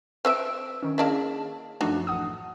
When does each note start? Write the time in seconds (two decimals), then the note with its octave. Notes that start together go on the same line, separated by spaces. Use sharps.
0.25 C4 B4 E5 E6 D7
0.83 D#3 C#4
0.98 A#3 D4 E4 G#4 D#5 A5
1.81 F#2 F3 A3 D4 D#4 F#4
2.07 A1 F#5 D#6